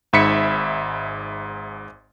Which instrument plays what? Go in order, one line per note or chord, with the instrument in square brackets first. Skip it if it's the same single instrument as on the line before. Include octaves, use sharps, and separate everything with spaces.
[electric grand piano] G#1 G#2 E5 B5 B6 C#7